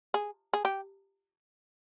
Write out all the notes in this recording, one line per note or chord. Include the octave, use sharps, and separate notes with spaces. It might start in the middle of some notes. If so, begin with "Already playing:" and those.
G#4
G#4
G4